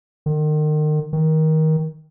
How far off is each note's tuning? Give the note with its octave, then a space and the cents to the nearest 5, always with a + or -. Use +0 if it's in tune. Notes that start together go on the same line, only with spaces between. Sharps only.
D#3 -35
D#3 +20